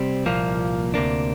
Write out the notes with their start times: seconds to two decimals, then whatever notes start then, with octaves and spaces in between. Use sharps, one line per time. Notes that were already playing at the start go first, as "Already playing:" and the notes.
Already playing: C3 G3 C4
0.26 C2 A#2 F3 A#3
0.94 D2 C3 A#3 D4